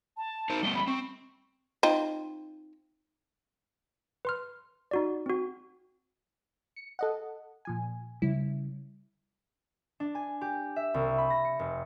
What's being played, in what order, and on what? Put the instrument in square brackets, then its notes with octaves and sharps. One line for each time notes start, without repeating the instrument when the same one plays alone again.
[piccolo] A5
[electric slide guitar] D#4 A#4 C5
[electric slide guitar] G3 A3 B3 [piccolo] G7
[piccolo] B5
[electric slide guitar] C4 [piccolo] C#6
[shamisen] C4 D#4 F4
[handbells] B4 C6 F6
D#4 F#4 D5
C4 F#4
[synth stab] C#7
A4 D#5 F#5
A#2 F3 G#5
[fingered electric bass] C#3 G3 [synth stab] E4
[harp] D4
G#5
G4
E5
C2
B5
A#6
C#7
F1